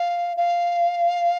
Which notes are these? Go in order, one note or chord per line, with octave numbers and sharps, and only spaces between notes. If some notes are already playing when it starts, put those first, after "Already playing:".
Already playing: F5
F5